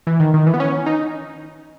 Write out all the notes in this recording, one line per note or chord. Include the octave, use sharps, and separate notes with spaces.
E3
D#3
D#3
E3
B3
C#4
D#4